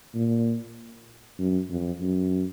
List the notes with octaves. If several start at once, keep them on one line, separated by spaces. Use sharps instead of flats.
A#2
F#2
F2
F#2